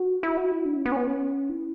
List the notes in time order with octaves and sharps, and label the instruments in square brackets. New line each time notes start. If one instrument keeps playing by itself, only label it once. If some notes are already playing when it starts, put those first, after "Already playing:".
Already playing: [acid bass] F#4
E4
F#4
E4
D4
C#4
B3
C#4
B3
C#4
E4